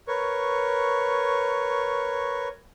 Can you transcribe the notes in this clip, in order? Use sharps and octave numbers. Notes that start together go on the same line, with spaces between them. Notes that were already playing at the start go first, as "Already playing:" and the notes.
A#4 B4 C#5 C#6